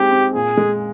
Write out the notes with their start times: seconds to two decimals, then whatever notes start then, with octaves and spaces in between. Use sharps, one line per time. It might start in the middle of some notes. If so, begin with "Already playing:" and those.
Already playing: G#3 C4 D#4 G4
0.11 C4
0.34 A#2 G#4
0.57 G#3